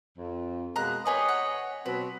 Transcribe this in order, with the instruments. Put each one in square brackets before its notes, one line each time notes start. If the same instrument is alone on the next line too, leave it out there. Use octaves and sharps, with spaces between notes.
[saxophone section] F2
[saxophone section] B2 G#3 A#3 [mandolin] A#5 F#6
[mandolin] G4 G#4 B4 [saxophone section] C#5 D#5
[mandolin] F#5
[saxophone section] B2 F#3 C4 [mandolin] B4